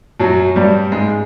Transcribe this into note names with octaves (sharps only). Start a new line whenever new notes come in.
F#2 F#3
G2 G3
G#2 G#3